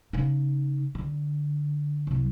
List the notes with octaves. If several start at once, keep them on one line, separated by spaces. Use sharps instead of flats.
C#3 D#4
D3
C2 F#3